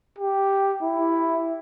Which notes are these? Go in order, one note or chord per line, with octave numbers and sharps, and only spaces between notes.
G4
E4